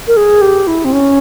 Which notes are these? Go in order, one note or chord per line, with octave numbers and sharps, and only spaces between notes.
A#4
G#4
G4
E4
C4
C#4